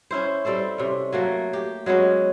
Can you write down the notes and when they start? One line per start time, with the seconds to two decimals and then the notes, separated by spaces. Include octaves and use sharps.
0.11 C#4 E4 C5
0.45 G3 C4 A4 C5
0.78 C3 C#4
1.12 F#3 A3 A#3
1.53 G4
1.86 F#3 G#3 B3 C#4